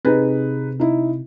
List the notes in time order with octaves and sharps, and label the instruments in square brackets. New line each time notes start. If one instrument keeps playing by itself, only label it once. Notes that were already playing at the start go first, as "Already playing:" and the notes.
[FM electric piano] C3 [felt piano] D#4 G#4 B4
[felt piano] D#4 E4